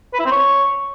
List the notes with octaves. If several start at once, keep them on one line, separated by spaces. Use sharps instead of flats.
B4
E4
C4
C#5